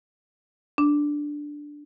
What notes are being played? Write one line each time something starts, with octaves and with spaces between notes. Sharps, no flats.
D4